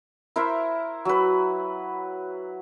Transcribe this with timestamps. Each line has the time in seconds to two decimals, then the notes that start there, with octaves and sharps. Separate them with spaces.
0.36 E4 A#4 C5 E5
1.05 F#3 B4